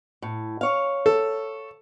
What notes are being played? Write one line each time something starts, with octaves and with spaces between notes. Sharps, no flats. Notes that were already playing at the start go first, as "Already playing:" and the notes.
A2
C#5 F5
A4